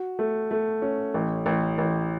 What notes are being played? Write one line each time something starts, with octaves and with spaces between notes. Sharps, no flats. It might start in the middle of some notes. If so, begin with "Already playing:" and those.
Already playing: F#4
A3
A3
C#4
A1
A1
A1